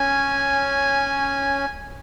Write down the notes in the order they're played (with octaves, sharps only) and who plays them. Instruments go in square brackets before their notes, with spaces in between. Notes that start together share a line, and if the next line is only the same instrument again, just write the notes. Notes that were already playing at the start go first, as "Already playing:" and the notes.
Already playing: [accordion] C#4 [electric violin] G#5